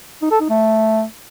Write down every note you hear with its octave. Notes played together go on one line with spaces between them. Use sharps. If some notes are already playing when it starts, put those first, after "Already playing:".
D#4
A4
D#4
A3